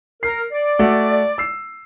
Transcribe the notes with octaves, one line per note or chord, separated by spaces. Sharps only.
A#4 C7
D5
A3 F#4
E6 C7